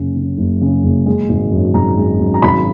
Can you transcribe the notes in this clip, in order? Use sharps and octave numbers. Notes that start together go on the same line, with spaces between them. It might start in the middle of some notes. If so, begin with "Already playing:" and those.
Already playing: F#1 C#3
C#3
F#1
C#3
F#1
G#3
G#1
F#2
G#1 A#5
G#3
F#2
A#5
G#1 B5